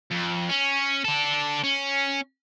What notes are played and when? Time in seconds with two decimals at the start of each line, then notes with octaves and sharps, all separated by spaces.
0.11 F2
0.49 C#4
1.05 D4 A4
1.64 C#4